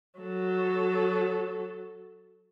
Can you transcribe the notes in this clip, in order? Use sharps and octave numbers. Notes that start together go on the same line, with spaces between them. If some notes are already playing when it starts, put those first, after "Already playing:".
F#3 A4